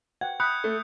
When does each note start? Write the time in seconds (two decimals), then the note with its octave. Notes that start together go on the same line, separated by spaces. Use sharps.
0.21 F#5 G5 G#6
0.40 B5 D#6 F#6 G6 C#7
0.64 A3